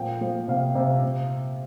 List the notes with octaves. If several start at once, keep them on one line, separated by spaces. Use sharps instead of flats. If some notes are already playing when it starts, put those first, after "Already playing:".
Already playing: A#2 F3 G5
F3
C3 F5
C3
C3